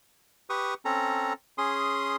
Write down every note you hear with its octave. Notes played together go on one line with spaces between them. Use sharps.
G4 B4 C#6 D#6
C4 C#4 A4 A#5
C#4 G#4 C6 D#6